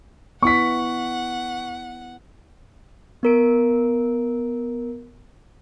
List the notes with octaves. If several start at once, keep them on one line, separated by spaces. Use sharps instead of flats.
B3 E4 F#5 C#6 B6
B3 A#4 D7